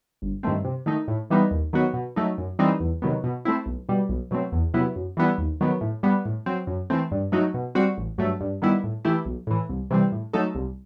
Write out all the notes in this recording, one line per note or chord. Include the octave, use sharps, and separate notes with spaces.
G1
G2 D#3 A3 C4
C3
D#3 A3 D#4
A2
E3 G3 B3 D#4
D#2
D#3 F#3 B3 F#4
B2
F#3 A3 D#4
F#2
E3 G3 C4 D#4
E2
C3 D#3 F#3 B3
B2
A3 C4 E4
B1
B2 G3
B1
B2 F#3 A3 C4
E2
C3 F#3 B3 E4
F#2
E3 G3 B3 E4
D#2
D#3 F#3 B3
A2
G3 B3
A2
F#3 C4
F#2
E3 A3 C4
G2
F#3 A3 D#4 F#4
B2
G3 C4 F#4
A1
G2 F#3 A3
G2
D#3 G3 B3 E4
A2
E3 A3 E4 G4
B1
A2 E3
C2
C3 E3 G3 C4
A2
F#3 A3 D#4 A4
C2